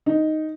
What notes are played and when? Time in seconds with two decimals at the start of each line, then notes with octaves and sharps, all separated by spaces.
0.06 D#4